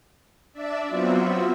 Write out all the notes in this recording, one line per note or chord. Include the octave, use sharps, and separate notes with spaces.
D4 D5 E5
F#3 B3 C4 F4 F#4 E5